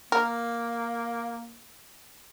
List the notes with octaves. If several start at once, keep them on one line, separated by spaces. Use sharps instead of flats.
A#3 A#4